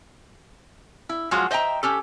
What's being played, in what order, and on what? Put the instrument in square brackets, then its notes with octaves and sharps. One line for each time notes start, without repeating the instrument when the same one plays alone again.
[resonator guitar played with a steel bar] E4
F3 F#3 G#3 F4 F#4
C5 D#5 E5 G5 A#5
C#4 G4 A4